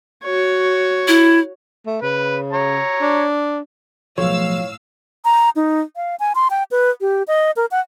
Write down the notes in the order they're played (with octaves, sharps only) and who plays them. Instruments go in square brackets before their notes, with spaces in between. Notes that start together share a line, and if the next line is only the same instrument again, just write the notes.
[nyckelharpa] F#4 C#5
[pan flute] E4
[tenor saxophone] A3
[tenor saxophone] C#3 [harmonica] B4
[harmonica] C#5 A#5
[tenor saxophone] D4
[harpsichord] B1 [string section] A2 F5 E6 [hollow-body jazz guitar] F3 [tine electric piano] C#5
[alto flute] A#5
D#4
F5
G#5
C6
G5
B4
G4
D#5
A#4
F#5